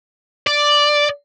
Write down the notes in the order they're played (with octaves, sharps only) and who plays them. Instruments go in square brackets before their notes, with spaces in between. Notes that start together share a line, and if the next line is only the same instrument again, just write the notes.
[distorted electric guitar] D5